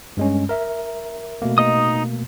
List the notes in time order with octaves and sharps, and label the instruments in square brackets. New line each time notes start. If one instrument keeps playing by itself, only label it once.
[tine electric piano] G2 G#3 C#4
A#4 E5
B2 A3 A#3
[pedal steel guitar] D#4 D#5 D#6